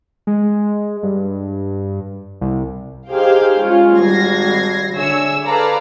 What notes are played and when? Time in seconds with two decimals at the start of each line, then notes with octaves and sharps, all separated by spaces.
0.27 G#3
1.03 G2
2.41 C2
3.10 D#4 G4 G#4 C5 F5 G5
3.60 G#3 C#4 F4
3.98 G#1 G3 G#6 A#6 C7
4.93 D3 G#4 C#5 E5 E6
5.46 G#4 A4 B4 D5 F5 A#5